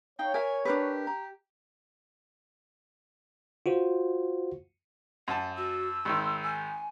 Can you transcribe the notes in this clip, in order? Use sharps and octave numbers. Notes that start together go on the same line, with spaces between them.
D#4 C#5 F5 G5
A#4 E5 G#5
D4 G4 A#4 B4
A#5
F4 F#4 C5
F#2 F#5 A5
F#4 E6
G#1 D#3 C6
G#5